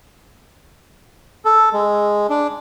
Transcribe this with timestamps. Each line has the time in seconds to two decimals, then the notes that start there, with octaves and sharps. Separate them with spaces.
1.45 A4
1.73 G#3
2.30 D4